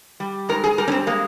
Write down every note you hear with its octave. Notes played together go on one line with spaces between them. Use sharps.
G3
G#2 A#4
G#4
G3 A#4
C#4
C4
G#3 A#3